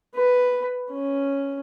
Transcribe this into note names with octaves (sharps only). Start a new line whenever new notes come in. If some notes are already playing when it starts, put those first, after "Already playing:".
B4
C#4